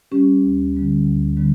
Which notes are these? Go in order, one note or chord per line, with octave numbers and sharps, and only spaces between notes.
G3 C#4 G4
D2
D3 G3 B3
D2
D3 G3 B3